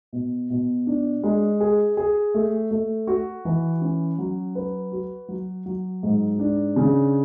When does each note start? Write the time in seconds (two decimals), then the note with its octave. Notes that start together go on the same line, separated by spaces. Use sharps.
0.13 B2
0.50 B2
0.87 D4
1.24 G#3
1.60 G#4
1.97 G#4
2.34 A3
2.71 A3
3.07 F#4
3.45 E3
3.82 C#4
4.18 F#3
4.55 B4
4.92 F#4
5.28 F#3
5.66 F#3
6.03 G#2
6.39 D4
6.76 C#3